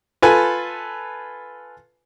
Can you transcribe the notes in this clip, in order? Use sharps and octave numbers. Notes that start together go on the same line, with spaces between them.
F4 A4 B4 G#5